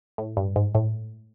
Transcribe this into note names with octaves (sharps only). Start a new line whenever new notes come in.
A2
G2
G#2
A2